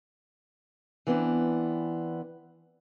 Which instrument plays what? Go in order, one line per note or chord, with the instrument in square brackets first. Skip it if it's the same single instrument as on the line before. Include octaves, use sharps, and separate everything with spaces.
[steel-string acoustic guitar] E3 B3 C4 D4